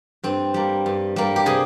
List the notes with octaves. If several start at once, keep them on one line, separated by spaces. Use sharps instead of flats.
G2 C4
G3 A#3
G2
G3 A#3
G4
C3 G#4